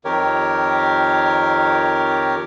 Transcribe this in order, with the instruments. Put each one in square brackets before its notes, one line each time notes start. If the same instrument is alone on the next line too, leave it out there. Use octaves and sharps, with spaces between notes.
[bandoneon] F2 D#3 G4 A#4 C#5